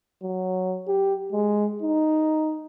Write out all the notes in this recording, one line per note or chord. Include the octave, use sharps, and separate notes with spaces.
F#3
G4
G#3
D#4